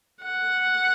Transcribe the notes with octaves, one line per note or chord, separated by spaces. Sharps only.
F#5